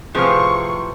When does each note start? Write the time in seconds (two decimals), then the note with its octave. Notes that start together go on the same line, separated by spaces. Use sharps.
0.15 A2 C3 F3 G#4 B4 C5 F5 C#6